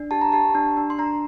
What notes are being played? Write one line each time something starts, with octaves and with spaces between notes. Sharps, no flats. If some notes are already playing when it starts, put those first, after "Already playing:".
Already playing: D4
G4 A5
A#5
G4 A5
D4
D4
C6
D4 A#5